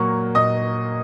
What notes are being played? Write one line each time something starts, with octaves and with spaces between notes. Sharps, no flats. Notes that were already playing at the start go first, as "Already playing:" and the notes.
Already playing: A#2 F#3 A#3 C#6
A#2 D#5 D#6